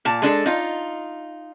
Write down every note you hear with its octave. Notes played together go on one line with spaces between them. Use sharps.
A#2 A5
G#3 D4 A4
D#4 F4